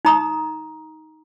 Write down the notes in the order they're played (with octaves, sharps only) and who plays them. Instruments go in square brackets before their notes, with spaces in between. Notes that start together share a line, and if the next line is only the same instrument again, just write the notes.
[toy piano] D#4 A#5 D#6